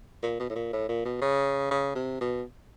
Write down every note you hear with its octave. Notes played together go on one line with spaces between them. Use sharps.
A#2
B2
A2
A#2
A2
A#2
B2
C#3
C#3
C3
B2